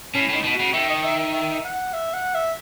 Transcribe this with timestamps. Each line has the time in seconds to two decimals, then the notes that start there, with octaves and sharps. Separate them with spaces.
0.14 A2 C#4
0.29 A2 D#4
0.44 B2
0.54 F#4
0.60 C#3
0.73 D#3 E5
0.89 D#5
1.04 E5
1.19 E5
1.34 E5
1.64 F#5
1.93 E5
2.13 F#5
2.34 E5